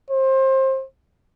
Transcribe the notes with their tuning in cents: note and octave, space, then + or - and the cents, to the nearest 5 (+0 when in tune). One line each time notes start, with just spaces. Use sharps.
C5 +25